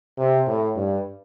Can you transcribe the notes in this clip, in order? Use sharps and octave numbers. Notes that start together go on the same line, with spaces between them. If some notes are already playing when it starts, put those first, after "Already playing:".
C3
A2
G2